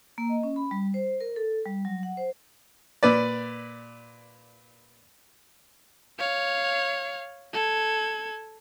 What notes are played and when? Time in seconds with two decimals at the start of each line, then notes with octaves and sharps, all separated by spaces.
0.18 A#3
0.29 D#5
0.43 C#4
0.56 B5
0.71 G3
0.94 C5
1.21 A#4
1.36 A4
1.66 G3
1.85 F#3
2.03 F#5
2.17 C5
3.03 A#2 B4 D5
6.19 C#5 F5
7.53 A4 G#6